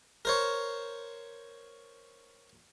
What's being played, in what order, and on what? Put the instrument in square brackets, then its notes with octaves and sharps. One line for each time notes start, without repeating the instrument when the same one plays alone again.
[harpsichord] A#4 C5 C#5